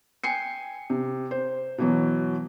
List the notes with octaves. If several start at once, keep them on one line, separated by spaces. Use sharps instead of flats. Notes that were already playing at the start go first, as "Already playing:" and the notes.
G5 G#5 C7 C#7
C3
C5
B2 E3 F#3